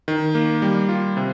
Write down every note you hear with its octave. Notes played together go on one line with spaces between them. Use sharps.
D#3
A#3
G3
F4
C3